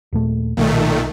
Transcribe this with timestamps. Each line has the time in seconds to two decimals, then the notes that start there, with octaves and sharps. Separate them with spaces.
0.12 D#2 A#2 A3
0.57 B1 A#2 D#3 A3